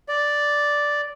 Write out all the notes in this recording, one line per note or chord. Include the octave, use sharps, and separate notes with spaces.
D5